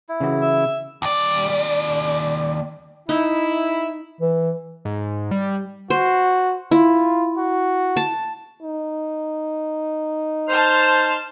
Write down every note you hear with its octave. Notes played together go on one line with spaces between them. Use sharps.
E4
C#3 E3 F#4
E5
D#2 D5
D#4 E4
E3
G#2
G3
F#4 C5
E4 F4
F#4
A5
D#4
C5 A5 C6 F6